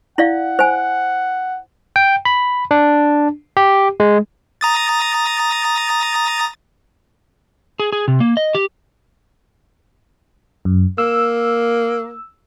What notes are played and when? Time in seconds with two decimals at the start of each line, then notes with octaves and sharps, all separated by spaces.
0.18 E4 D5 F5 F#5
0.59 C5 G#5
1.96 G5
2.25 B5
2.71 D4
3.57 G4
4.00 G#3
4.61 A#5 D#6 A6
7.80 G#4
7.93 G#4
8.08 C3
8.20 A#3
8.37 D#5
8.55 G4
10.65 F#2
10.98 A#3 E6